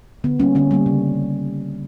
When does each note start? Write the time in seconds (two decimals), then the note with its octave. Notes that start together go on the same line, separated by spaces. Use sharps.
0.24 D3 B3
0.39 G3 A#3 C#4
0.55 D3 C#4
0.71 G3 A#3
0.86 C#3